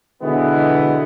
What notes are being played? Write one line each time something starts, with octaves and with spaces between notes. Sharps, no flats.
B2 D3 E3 G#3 B3